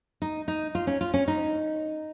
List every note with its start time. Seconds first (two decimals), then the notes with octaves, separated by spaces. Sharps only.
0.22 D#4
0.48 D#4
0.75 F4
0.87 C#4
1.01 F4
1.14 C#4
1.28 D#4